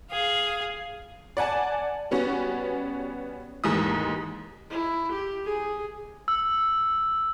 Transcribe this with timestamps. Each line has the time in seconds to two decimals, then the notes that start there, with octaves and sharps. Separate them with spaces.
0.11 G#4 F5
1.37 D5 F#5 G#5 A5
2.11 G3 B3 C#4 F#4
3.64 D#2 G#2 E3 A3 D#6
4.70 E4
5.13 G4
5.45 G#4
6.28 E6